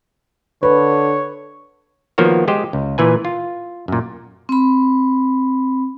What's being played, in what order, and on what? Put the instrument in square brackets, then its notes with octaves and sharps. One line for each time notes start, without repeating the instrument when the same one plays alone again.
[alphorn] D3 [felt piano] B4 [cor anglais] C#5
[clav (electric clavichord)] D#3 F3 A#3 B3 F#4 C#5
G#3 G4 C5 D#5
C#2
A#2 E3 B4 G#5
F4
F#2 A#2
[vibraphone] C4 B5